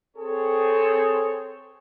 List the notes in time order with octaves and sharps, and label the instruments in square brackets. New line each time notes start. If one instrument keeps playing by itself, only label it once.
[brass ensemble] C4 G#4 A4 C#5